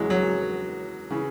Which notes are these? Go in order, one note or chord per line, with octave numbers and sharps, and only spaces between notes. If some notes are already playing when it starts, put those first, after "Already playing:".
Already playing: E2 C#3 E3 F#3 G#3
F#3
C#3 E3